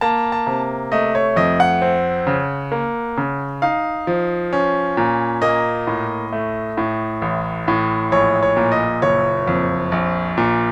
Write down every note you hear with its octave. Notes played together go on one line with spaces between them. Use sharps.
A#3 A5
A5
C3
A3 D#5
C#5
F2 D#5
F#5
C4
C#3
A#3
C#3
D#4 F5
F3
C#4
A#2
A#3 D#5
A2
A3
A2
A1
A2
A#1 C#5
C#5
A#2
D#5
F#1 C#5
F2
A#1
A#2